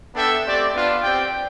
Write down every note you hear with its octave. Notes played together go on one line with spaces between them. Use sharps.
B3 D4 A4 E5 G5
A3 C4 G4 D5
B3 D4 F4
C4 G4 D5 G5